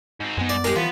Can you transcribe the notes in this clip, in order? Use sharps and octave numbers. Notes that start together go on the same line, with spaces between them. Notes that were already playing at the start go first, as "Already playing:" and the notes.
G#2 C4
F#2 G#3 B3 D#4
D5
G#3 G4 A#4
E3 F3 B3